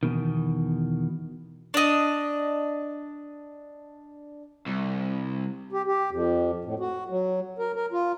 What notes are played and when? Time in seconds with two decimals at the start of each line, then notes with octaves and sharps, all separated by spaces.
0.03 E2 G#2 B2 D#3
1.74 D4 D#5
4.66 C2
5.72 G4
5.87 G4
6.11 F2
6.65 A2
6.80 F#4
7.10 F#3
7.59 A#4
7.76 A#4
7.92 F4